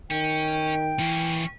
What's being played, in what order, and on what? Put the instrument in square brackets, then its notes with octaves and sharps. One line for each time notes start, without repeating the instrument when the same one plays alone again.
[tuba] D#3 [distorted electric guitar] C#4 [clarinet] G5
[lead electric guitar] E3 [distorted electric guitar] A#3 C#4